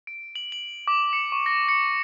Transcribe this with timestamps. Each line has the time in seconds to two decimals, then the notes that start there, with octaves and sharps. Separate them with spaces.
0.07 D7
0.36 F#7
0.52 F#7
0.88 D6
1.13 C#7
1.32 C#6
1.46 A#6
1.69 C#7